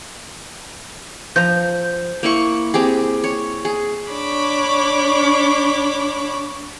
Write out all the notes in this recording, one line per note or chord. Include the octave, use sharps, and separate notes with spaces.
F3 A#5 G6
A#3 E4 C#6
C4 G4 G#4
C#5
G#4
D4 C#5 B5 D6